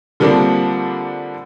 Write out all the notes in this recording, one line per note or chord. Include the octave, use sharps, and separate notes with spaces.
D3 F3 G3 A#3 C4 D4